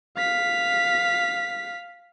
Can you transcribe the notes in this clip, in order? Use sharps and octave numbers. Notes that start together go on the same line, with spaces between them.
F5 B6